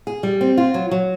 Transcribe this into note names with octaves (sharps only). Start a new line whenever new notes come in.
G#4
G3
C4
F4
F#3
F#3